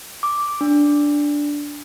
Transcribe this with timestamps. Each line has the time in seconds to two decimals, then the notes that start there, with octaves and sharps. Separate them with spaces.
0.23 D6
0.61 D4